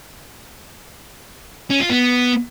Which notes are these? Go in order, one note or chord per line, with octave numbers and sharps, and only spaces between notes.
C#4
F4
B3